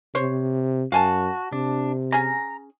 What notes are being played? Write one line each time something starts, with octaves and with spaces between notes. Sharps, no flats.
C3 C5 C#5
F#2 F#4 F5 G#5 A5
C3 D4
C#4 G#4 A#5